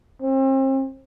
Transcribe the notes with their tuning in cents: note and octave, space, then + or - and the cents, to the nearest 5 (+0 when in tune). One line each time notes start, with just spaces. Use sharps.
C4 +40